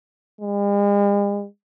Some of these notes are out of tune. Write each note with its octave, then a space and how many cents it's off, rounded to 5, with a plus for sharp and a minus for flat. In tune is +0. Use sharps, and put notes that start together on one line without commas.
G#3 -45